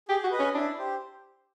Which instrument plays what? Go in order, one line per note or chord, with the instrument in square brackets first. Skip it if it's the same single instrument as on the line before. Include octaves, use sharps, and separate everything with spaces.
[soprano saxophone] G4 [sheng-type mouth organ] G#4
[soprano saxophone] F#4
[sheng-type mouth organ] B4 D#5
[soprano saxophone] C#4
[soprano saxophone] D4 [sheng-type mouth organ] E4
[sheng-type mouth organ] G4 C5